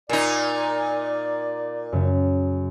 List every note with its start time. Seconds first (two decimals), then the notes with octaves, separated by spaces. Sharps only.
0.09 A#2 D#4 D5
1.92 F#2 C#3